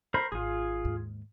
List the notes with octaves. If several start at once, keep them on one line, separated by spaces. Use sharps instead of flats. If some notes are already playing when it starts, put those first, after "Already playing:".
A#4 C5 B5
G#1 F4 G#4
D#2 G#2